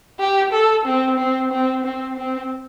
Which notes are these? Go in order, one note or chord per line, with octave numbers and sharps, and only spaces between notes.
G4
A4
C4
C4
C4
C4
C4